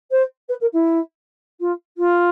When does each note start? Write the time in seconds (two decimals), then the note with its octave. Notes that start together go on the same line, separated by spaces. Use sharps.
0.11 C5
0.48 B4
0.60 A#4
0.73 E4
1.60 F4
1.97 F4